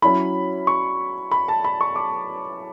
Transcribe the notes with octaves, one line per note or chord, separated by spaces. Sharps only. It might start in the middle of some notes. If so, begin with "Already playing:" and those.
F#3 C#4 E4 B5
C#6
B5
A5
B5
C#6
D6